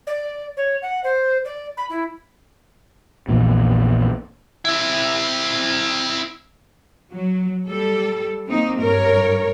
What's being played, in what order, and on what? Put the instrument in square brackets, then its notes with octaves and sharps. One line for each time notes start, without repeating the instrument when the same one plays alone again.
[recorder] D5
C#5
F#5
C5
D5
B5
E4
[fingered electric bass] A#1 E2 A#2
[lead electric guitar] C4 E4
[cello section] F#3
G3 A4
A#3 C4 D#4
G2 A#4 C#5